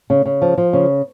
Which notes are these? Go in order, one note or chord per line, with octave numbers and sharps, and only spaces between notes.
C#3
C#3
F3
F3
C#3